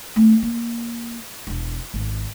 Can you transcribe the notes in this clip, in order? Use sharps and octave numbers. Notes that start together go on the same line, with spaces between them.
A3 C4
A#3
E1 D4
G#1